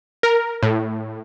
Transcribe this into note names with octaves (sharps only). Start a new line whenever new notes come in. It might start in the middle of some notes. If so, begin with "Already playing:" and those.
A#4
A2